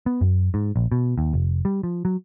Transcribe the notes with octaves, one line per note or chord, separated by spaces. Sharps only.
B3
F#2
G#2
A#1
B2
D#2
F1
G3
F3
F#3